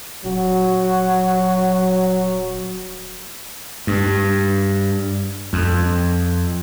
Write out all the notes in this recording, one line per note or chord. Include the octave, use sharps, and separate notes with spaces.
D#1 F#3 F#4
G2
F2